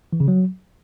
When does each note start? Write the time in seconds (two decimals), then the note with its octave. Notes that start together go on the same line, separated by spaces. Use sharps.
0.13 E3
0.20 C#3
0.28 F#3